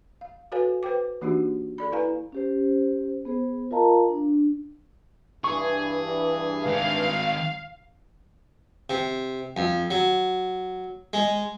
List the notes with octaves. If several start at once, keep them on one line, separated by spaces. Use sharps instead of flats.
F5
F#4 A4 B4 C#5 F5 G#5
B4 C5 G5 D6
E3 A#3 D4 D#4 F#4 G4
A4 D5 B5
E4 B4 F5 G#5 A#5
C#4 G4 C5
B3 G#4 C5
F4 A#4 D#5 F5 A5 A#5
D4
G2 E3 G#4 C#6
D#3 G#3 F5
C3
F2
F#3
G#3